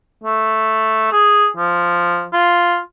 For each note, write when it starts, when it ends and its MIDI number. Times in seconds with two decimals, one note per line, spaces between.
0.24 1.10 57
1.12 1.47 68
1.57 2.25 53
2.33 2.79 65